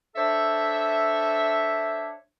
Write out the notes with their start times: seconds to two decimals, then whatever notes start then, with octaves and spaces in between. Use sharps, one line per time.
0.16 D4 A4 C5 C#5 E5